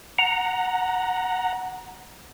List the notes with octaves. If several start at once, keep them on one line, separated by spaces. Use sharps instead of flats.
F#5 A#5